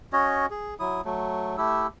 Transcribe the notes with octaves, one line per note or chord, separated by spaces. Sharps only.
C#4 F#4 C#5 D#5
G#4
F#3 E4 D#6
F#3 A3
A3 E4 G4 E6